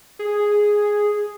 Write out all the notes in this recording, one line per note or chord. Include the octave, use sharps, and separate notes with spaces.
G#4